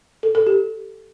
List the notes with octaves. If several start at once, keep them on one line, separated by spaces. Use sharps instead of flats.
A4
A4
G4